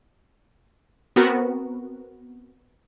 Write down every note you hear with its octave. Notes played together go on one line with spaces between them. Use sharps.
B3 C4 F#4 A#4